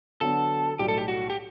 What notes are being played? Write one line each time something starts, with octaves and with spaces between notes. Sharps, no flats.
D3 F#3 B3 F#4 A4
B1 A2 G3 G4
A4
G4
F#4
G4